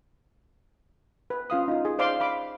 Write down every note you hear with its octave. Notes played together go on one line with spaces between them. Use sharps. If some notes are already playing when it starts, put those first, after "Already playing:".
B4
C#4 F4 F5 D#6
D#4 F4
G#4
C5 D5 F5 C6 D6
F5 B5 D6